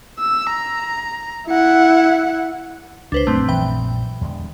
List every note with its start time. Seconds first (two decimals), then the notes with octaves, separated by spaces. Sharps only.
0.19 E6
0.50 A#5
1.47 E4 F#5
3.12 C#2 D4 B4 C5
3.27 A#1 F#2 G3 A3 C4
3.48 E3 G5
4.21 E2 D3 G#3